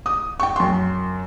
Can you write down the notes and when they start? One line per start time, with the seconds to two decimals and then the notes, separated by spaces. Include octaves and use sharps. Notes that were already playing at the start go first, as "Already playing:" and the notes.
0.06 D#6
0.40 G5 C#6
0.56 F#2 C6